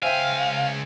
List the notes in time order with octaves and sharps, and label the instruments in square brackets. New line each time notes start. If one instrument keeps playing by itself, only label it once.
[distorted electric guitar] C#2 G#5 [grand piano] C5 E5 G5 [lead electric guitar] F5